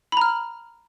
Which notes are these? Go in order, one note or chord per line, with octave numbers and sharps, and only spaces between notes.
A#5 B5 F6